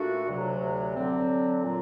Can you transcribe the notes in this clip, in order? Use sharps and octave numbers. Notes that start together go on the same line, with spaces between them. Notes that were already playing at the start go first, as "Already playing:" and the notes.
Already playing: A#2 A3 D4 F#4
D2 C3 F#3
D3 F#3 C4
A#2 F#3